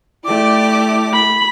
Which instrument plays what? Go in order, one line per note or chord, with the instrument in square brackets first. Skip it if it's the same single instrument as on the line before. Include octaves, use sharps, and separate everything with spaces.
[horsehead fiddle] A3 E4 [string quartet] G4 D5 [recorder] D6
[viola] B5